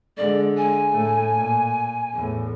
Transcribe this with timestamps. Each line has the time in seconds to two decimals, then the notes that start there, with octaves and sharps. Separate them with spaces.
0.17 D3 G#3 D5
0.57 G#5
0.90 A2 A3
1.34 A#2
2.14 E2 A2